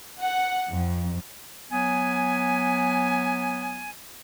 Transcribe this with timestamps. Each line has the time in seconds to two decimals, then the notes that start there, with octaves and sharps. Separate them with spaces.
0.20 F#5
0.70 F2
1.70 F#3 B3 G#5